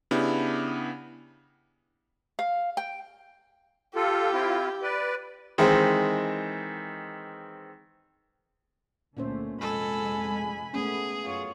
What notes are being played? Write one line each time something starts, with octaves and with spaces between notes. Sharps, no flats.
C#3 B3 D4 E4 G4
F5
G5
F4 G4 A4
C4 E4 F4
B4 D5
D#3 E3 G#3 C4
C#2 A#2 D3 A3 C#4 C5
F1 F2 G#3 A4 G#5 B5
A3 B3 C#4 G#4
F#2 F4 C#5